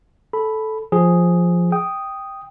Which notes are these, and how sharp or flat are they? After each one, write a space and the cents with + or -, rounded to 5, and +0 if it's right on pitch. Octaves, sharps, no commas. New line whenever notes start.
A4 -10 B5 +0
F3 +0 G#4 +0
G5 +0 D#6 +0